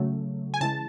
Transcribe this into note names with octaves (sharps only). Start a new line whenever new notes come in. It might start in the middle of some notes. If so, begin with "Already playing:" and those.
Already playing: C#3 F#3 A3
G#5
C#3 E3 G#3 A5